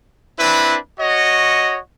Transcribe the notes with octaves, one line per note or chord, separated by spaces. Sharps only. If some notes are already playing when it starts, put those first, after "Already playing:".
C4 D4 E4 B4
F#4 C#5 D#5